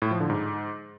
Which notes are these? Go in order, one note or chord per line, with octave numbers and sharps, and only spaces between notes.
A2
F3
D3
G#2